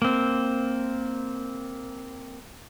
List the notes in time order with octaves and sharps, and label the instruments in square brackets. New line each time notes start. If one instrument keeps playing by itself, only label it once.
[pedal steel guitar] A#3 C4